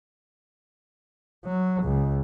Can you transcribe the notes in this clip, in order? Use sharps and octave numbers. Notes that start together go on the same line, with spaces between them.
F#3
C#2